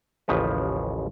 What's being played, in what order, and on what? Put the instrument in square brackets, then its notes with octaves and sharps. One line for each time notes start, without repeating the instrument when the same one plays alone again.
[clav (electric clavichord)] A1 D#2 C#3 F3 B4